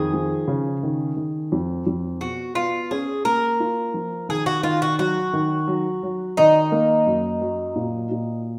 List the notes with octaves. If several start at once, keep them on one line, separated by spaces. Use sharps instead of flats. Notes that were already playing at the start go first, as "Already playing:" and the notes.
Already playing: F2 D#3 G#4
F3
C#3
D#3
D#3
F2
F2
B2 F#4
B3 F4
C#4 G#4
A#3 A#4
F4
F3
D#3 G#4
F#4
D#3 F4
F#4
F#3 F#4
D#3
F#3
F#3
D#3 D#4
A#3
F#2
F#3
A#2
A#2